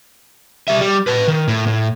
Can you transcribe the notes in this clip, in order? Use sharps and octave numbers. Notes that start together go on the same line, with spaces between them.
G3 E5
G3
B4 A5
D#3
A2
A2